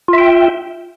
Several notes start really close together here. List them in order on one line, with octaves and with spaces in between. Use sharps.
F4 E5 G5